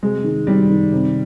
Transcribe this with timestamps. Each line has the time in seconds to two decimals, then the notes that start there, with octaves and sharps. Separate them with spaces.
0.03 C3 G#3
0.24 D#3
0.47 D#3 G3
0.70 D#3
0.92 C3